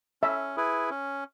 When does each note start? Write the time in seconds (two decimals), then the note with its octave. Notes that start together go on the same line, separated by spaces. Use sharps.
0.23 C#4 E5
0.57 E4 G#4 B4
0.90 C#4